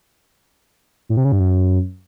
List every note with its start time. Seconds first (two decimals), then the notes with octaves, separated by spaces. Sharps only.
1.09 A2
1.17 C3
1.25 C#3
1.32 G2
1.40 F#2